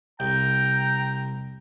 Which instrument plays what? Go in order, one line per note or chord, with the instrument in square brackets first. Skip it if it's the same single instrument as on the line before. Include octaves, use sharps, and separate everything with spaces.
[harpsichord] C2 [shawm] G5 [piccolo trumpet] A#5